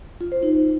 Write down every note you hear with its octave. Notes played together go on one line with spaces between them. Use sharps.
F4
C5
D#4